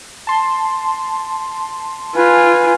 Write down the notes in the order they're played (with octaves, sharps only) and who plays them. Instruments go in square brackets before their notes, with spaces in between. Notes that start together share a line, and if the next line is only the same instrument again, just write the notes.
[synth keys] A5 C6
[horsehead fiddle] F4 [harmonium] B4 G#5